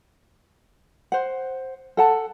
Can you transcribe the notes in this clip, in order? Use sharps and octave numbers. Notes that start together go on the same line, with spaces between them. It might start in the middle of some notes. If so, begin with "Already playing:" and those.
C5 F#5
A4 F#5 A5